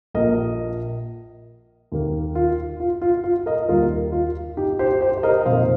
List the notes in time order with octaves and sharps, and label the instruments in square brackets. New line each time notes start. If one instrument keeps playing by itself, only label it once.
[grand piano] A#1 A#2 A#3 A#4 D#5
D#2 D#3 A#3
F4
F4
F4
F4
A#4 D#5
D#2 D#3 G3 A#3 F4 A#4
F4
D#4 G4
G4 C5
G4 C5
C5
A#4 D#5
D#5
F2 C3 D#3 A#3 C5 F5